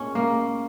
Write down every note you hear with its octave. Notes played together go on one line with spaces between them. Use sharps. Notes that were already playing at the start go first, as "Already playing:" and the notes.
Already playing: A#2 G#3 C#4
A#3